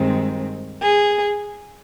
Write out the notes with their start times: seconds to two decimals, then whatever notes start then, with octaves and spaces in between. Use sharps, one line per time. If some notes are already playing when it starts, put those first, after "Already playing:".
Already playing: G2 D#3 G#3 C4
0.81 G#4